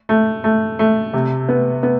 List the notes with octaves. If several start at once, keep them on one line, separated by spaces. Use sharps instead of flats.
A3
A3
A3
C3
B3
B3